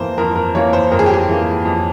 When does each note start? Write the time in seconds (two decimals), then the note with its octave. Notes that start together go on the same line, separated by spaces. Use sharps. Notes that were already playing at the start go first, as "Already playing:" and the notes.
Already playing: F2 E3 A#3 C5
0.18 F2 A#4
0.36 A#4
0.55 E3 A#3 C#5
0.73 C5
0.92 F2 A#4
0.99 G#4
1.06 G4
1.14 G#4
1.28 E3 A#3
1.65 F2